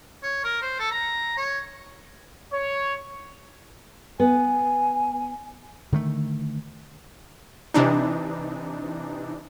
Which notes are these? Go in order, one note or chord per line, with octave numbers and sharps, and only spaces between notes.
C#5
A#4
C5
A4
A#5
C#5
C#5
B3 G#5
D3 D#3 G#3 A3
C3 E3 D4 D#4